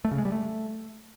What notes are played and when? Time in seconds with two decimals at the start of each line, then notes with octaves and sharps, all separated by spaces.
0.05 A3
0.11 C#3
0.18 G#3
0.25 G3
0.32 A3